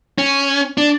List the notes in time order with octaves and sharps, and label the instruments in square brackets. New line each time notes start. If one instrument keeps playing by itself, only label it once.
[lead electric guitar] C#4
D4